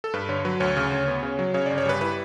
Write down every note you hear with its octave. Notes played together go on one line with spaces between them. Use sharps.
A4
G2 B4
D3 C#5
F#3 B4
D2 C#5
C#3
D2
B3
C#3
F#3
C#3 C#5
G1 D5
C#5
G3 B4
E4 B4